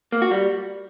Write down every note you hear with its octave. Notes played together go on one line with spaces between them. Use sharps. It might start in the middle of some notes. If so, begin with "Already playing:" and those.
A#3
F#4
G3